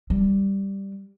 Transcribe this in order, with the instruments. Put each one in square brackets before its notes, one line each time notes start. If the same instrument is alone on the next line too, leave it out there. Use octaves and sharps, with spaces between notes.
[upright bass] G3